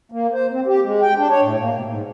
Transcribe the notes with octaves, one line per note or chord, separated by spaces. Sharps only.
A#3
C5
C4
G4
G#3
G5
D4
C#5
A2
A#3
B2
G#2